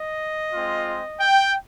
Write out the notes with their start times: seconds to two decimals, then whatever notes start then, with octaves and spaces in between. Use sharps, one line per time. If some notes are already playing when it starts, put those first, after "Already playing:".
Already playing: D#5
0.53 G#3 C4 F4
1.20 G5